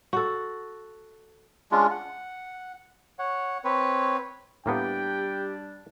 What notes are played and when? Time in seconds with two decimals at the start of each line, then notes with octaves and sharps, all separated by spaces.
0.13 F#4 A4
1.72 G#3 C#4 D4 F4
1.91 F#5
3.19 C#5 F#5
3.64 C4 B4 C#5
4.66 A2 G3 A#3 B3 D4 G4 G5